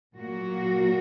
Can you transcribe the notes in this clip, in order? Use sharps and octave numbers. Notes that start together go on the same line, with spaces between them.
A#2 F#3 A#3 F#4